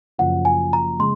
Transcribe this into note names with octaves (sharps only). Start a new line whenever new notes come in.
F#1 F#2 F3 F#5
G#5
A#5
C#3 G#3 C6